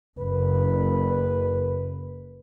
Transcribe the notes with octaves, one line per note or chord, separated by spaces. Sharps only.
F#1 B4